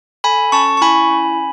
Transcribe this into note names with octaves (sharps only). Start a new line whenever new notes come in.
A4 G#5 B5
C#4 A5 C#6
C#6
E4 G#5 B5
C#4